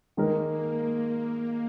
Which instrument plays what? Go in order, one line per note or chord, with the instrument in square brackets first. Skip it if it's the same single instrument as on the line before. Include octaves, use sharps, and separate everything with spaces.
[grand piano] D#3 G#3 D#4 A#4 [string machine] A#3
[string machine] A#3